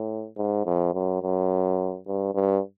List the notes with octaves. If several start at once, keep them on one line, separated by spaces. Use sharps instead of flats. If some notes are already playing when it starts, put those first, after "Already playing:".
Already playing: A2
G#2
F2
F#2
F#2
G2
G2